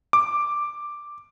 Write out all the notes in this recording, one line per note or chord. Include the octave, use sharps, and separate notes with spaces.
D6